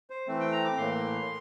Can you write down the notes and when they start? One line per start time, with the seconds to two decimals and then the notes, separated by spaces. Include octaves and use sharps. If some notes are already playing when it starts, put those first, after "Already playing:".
0.10 C5
0.27 E3 A3 C4
0.40 G5
0.52 A#5
0.65 D6
0.77 A2 E3 A#3 C6